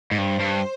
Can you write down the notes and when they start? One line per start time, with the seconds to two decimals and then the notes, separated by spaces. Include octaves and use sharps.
0.11 G#2
0.17 G2 C5
0.40 G2